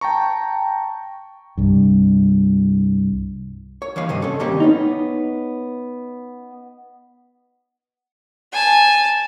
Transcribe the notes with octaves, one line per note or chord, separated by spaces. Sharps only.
G5 A5 A#5 C#6
C2 G2
C#5
D#2 E3 C#5 F5
G2 C3 C5 D#5
C#4 A4
D#3 G3 A#3 C4 G4 C#5
B3 C#4 D#4
G#5 A5